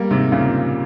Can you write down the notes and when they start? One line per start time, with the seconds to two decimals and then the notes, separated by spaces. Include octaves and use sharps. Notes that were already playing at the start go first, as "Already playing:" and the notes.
Already playing: G3 A#3
0.11 G#2 C3
0.32 A#2 C#3